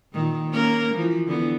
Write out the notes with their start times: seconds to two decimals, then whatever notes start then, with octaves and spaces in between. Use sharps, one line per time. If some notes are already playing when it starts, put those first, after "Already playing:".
0.12 A#2 D#3
0.51 A#3 C#4 A#4
0.95 E3 F3
1.27 D3 E3 B3